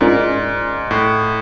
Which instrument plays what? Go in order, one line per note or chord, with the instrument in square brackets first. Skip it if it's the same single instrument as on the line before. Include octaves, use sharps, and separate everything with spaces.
[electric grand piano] G#2 [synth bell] C#4 F4 A#4 D5
[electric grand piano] A2